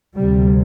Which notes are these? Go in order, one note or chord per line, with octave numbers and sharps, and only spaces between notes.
D2 C3 G3